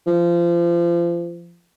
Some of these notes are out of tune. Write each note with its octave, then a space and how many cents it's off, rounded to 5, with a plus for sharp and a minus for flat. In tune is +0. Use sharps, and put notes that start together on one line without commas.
F3 -30